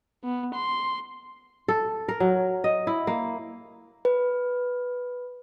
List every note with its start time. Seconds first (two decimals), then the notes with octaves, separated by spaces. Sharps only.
0.24 B3
0.55 C6
1.68 A4
2.08 A#4
2.20 F#3
2.64 D#5
2.87 E4
3.07 A#3
4.05 B4